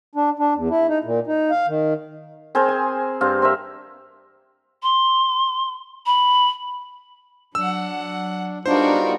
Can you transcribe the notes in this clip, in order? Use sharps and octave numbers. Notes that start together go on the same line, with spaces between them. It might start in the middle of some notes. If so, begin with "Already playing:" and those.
D4
D4
E2
E4
D#4
A#2
D#4
F5
D#3
C4 G#4 A#4 C5
G#5
G2 C4 F5
C4 A#4 E5
C6
B5
F#3 D4 F#5 E6
G3 B3 D4 D#4 F4 F#4 A#4 C5